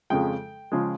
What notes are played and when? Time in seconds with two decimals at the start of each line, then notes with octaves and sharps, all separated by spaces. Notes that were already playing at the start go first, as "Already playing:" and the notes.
0.10 F2 C#3 F3 G#3 G5
0.72 C#3 F3 G#3